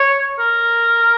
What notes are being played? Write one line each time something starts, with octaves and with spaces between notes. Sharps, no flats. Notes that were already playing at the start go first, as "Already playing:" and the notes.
Already playing: C#5
A#4